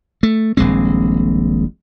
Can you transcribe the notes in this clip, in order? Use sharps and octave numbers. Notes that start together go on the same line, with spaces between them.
A3
D#1 A#1 G#3 C4